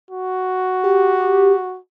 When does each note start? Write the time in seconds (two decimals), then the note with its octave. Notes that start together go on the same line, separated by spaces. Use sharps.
0.11 F#4
0.84 G4